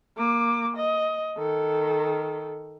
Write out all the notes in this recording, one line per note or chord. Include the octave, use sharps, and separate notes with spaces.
A#3 D6
D#5
D#3 A4